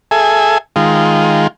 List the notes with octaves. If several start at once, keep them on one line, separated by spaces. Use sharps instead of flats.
G#4 A4 E5 G#5
D#3 G#3 F4